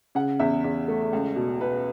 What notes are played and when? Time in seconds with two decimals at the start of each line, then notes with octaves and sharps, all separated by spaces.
0.15 C#3 F#5
0.40 E2 E5
0.64 E2
0.88 A3
1.13 C#2
1.36 B2
1.60 B2 B4